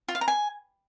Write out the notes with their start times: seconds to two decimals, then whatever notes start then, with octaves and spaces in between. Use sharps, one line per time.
0.08 F4
0.15 F5
0.21 A#5
0.28 G#5